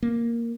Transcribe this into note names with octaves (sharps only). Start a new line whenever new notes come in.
A#3